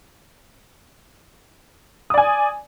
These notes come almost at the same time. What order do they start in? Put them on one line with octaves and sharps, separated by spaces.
D#6 D5 G#5